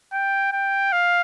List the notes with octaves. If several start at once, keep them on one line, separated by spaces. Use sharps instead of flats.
G5
G5
F5